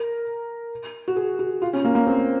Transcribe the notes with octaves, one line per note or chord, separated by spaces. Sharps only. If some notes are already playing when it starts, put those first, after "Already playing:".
Already playing: A#4
F#4
G#4
F#4
F4
C#4
A#3
A#3
C4